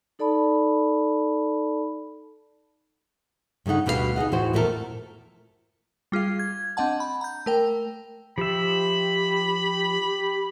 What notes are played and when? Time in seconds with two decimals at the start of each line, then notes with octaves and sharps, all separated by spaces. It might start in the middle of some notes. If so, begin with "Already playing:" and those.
0.19 D#4 A4 D5 A5 B5
3.66 G2 C#3 A3 D#4 F#5
3.86 D2 B2 G3 B3 A4 F5
4.16 D#4 G#4 D#5 F#5
4.32 E2 A2 E3 E4 F#4 C5
4.53 F2 A#2 A3 D#4 A4 A#4
6.12 G3 F4 G#4 F5
6.39 G#6
6.77 C4 D4 D#5 F#5 A5
7.00 B5
7.21 A#5 G6
7.46 A3 A#4 G5
8.38 F3 G4 E5 B5